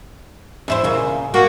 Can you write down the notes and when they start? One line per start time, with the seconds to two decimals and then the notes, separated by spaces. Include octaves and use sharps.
0.68 E2 E4 C5
0.84 A#2 C#3
1.34 A#3 F#4